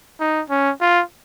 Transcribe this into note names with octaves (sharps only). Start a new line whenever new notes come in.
D#4
C#4
F4